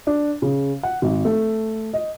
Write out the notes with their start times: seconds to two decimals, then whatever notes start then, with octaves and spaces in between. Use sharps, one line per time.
0.07 D4
0.42 C#3
0.83 F#5
1.02 G#1
1.25 A3
1.93 D#5